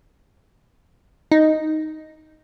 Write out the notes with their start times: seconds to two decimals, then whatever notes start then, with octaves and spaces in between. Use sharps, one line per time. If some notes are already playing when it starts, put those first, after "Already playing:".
1.31 D#4